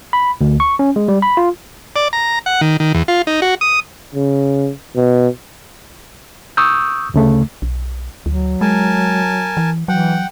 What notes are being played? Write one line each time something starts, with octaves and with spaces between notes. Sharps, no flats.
B5
D2
C#6
C#4
G#3
G3
B5
F4
D5
A#5
F#5
D#3
D#3
E2
F4
D#4
F#4
D#6
C#3
B2
C#6 D#6 E6 G6
D2 C#3 A3
B1
D2 F#3
G#3 A#4 G#5 A5
E3
E3 F#3 F#5 G5